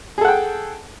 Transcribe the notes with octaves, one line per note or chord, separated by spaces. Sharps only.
G#4 A4 F#5 G5